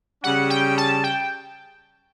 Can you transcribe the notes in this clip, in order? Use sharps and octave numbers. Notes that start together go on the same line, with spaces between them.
C#3 G3 C#4 F#5
G5
A5
G5